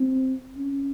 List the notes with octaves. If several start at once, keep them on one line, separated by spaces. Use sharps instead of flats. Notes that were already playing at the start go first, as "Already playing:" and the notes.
Already playing: C4
C#4